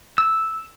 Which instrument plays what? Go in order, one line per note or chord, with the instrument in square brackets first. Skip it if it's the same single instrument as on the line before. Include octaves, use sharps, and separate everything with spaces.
[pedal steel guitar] E6